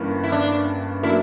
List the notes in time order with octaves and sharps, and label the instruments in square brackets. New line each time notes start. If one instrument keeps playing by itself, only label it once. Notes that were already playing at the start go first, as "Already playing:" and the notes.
Already playing: [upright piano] G1 G2 E3 A#3 C#4
[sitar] E4
D4
[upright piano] F#3 A#3 D4 A#4 [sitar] E4